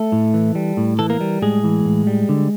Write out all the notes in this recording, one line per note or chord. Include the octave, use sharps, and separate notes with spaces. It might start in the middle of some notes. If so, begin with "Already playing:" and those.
Already playing: A3 A4
A2
E3
G3
A2
E3 A4
A#3 A#4
G3
A2 G#3 G#4
E3
A2
G3
D3